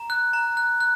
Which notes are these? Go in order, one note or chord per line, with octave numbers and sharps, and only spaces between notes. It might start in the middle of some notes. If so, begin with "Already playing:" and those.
Already playing: A#5
F#6
A#5
F#6
F#6